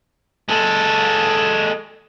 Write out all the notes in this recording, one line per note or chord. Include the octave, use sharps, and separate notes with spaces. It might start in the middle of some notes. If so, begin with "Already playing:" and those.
G#3 A4